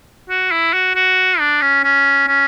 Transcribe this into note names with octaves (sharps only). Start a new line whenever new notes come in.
F#4
E4
F#4
F#4
D4
C#4
C#4
C#4